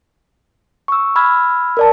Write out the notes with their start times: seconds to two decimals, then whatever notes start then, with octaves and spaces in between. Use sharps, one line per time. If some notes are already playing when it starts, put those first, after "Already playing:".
0.88 C#6 E6
1.16 B5 E6 F6 G#6
1.77 A#4 D5 A5